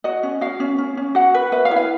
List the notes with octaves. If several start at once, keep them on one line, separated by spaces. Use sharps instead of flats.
F#4 D#5
C#4
F#4 F5
C#4
C#4
C#4
F#4 F#5
B4
B4 E5
F5
E4
F5